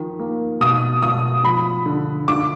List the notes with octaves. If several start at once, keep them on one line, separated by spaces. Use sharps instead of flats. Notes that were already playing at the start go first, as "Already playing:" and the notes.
Already playing: D#3 F3
A#3
B2 D#6
B2 D#6
F3 B5
D3
D3 D6